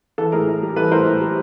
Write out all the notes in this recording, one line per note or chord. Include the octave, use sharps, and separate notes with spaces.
E3 A4
A2 G#4 A#4
A2
G3
E3 A4 B4
A2 A#4 C5
A2
G3